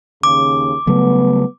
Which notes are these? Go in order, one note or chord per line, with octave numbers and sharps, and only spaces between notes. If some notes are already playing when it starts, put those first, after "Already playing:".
D#2 C#3 D6
C#3 F#3 G3 A3 B3